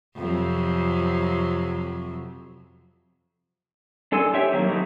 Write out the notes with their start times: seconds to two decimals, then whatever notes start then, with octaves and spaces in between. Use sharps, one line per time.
0.17 F2 C3 F#3
4.12 D4 A4 G#5 C6 E6
4.34 G4 C5 C#5 E5 G5
4.52 D#3 F#3 A#3 C4
4.68 F#3 A3 D#4 E4